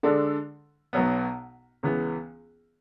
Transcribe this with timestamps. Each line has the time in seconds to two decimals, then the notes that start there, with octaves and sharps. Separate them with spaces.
0.03 D3 G#3 D4 A4
0.93 B1 B2 F#3 B3
1.83 C#2 C#3 E3 B3